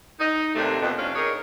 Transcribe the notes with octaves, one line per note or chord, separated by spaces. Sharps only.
D#4
D#2 C3 A3 D4
F2 B2
C3 C#4 D4 F5
D#4 G#4 A#4 C#5